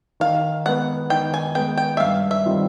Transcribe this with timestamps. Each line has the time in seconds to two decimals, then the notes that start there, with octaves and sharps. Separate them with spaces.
0.20 D#3 F5
0.66 G#3 B3 F#5
1.10 D#3 G5
1.34 G#5
1.55 G#3 B3 G5
1.77 G5
1.97 E5
2.00 G2 F5
2.31 E5
2.45 D#3 G3 C4 F4